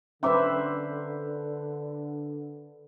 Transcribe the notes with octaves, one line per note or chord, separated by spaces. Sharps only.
D3 C#4 B4 C5 E5 A#5 D6